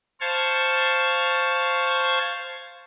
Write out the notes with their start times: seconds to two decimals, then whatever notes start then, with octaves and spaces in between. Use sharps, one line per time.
0.21 C5 F5 A5 C#6 G#6